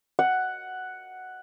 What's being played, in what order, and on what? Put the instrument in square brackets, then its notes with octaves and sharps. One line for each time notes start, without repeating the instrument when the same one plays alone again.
[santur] F#5